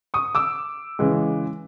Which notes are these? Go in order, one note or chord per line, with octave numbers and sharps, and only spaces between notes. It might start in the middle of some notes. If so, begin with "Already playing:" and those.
C#6 D#6
D6 E6
C#3 E3 G#3